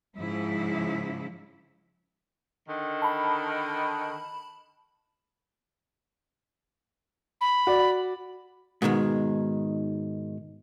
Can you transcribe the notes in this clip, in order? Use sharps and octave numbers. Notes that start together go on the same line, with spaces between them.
G#2 C#3 F3 E4
D3 D#3
A5 B5
B5
F#4 D5
G#2 B2 D#3 G#3